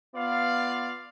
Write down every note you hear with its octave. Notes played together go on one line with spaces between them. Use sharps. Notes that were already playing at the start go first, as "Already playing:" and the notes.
B3 F4 D5 F5